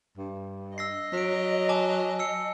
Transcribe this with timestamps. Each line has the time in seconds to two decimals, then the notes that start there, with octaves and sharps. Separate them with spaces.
0.17 G2
0.78 D#5 E6 A#6 C7
1.13 F#3 B6 D7
1.69 G#5 A5 D6
2.19 E6 C7 C#7